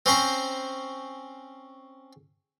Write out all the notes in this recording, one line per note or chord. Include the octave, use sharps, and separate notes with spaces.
C4 C#4 C5 A#5